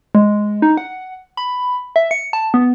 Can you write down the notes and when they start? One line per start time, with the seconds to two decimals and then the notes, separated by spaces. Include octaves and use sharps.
0.15 G#3
0.62 D#4
0.77 F#5
1.37 B5
1.96 E5
2.11 C#7
2.33 A5
2.54 B3